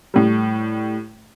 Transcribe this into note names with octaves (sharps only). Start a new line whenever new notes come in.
A2 G3